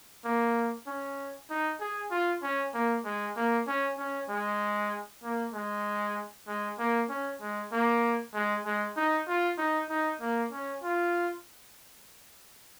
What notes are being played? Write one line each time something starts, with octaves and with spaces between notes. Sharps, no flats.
A#3
C#4
D#4
G#4
F4
C#4
A#3
G#3
A#3
C#4
C#4
G#3
A#3
G#3
G#3
A#3
C#4
G#3
A#3
G#3
G#3
D#4
F4
D#4
D#4
A#3
C#4
F4